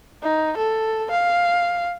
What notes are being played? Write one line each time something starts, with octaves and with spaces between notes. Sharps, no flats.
D#4
A4
F5